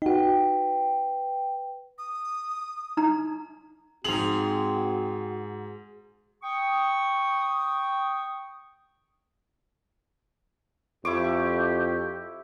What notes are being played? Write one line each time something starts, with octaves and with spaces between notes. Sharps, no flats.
D#4 F#4 B4 G5
D#6
D#4 A#5
G#2 C4 F#4 G#4 F7 F#7
G5 C#6 D#6
F2 E4 G4 C#6 D6